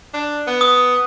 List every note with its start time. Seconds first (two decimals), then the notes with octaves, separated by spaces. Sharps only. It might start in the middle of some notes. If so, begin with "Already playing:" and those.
0.14 D4
0.47 B3
0.61 D#6